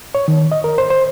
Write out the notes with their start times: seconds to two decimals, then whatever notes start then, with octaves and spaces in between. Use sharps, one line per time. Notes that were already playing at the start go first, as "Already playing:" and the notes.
0.15 C#5
0.28 D#3
0.52 D#5
0.64 A#4
0.78 C5
0.90 C5